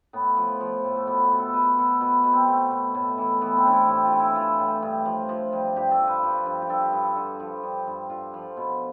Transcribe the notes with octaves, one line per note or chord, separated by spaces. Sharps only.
A2 B3
F3
F3
A2
A3
B2 B3
B2
A4
B2 B4
A4
B2 A4
A4
B2 B4
B2
C4
B2 A3
B2
A2
E3
E3 B3
C4
A2 D4
E4
A2 G4
F4
E3
E4
E3 F4
A2
G2
F3
F3
G2
G2 G4
A4
F3
B4
F3
G2
G4
G2 A4
G4
G2 B4
A4
D3 F4
F3
G2
G2
D3 F4
F3
B2